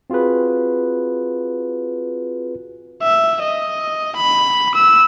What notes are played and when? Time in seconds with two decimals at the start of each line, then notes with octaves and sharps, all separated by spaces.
0.10 C4 F4 F#4 G#4 B4
3.03 E5
3.42 D#5
4.16 B5
4.74 E6